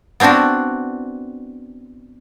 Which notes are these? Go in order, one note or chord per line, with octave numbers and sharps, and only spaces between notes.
B3 C4 D4 E4 F#4